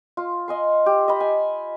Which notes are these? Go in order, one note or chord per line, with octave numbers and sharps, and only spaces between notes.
F4
D#5 G#5 C6
G4
D#5 B5
G#5